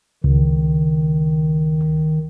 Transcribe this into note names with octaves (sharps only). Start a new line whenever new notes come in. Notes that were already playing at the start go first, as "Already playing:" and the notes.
C#2 D#3